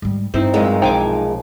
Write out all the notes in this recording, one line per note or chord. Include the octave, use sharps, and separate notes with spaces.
G#2 G3
G2 C4 D#4 E4
F#2 A#2 G#3 B3 D#5
B1 F3 D#4 C5 G5 G#5 D6